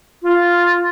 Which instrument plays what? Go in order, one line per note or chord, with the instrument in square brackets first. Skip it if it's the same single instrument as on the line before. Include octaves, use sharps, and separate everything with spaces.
[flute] F4